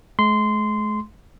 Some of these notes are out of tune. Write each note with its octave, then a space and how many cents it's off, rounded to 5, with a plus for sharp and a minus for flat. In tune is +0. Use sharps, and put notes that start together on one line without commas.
G#3 +45 C6 -15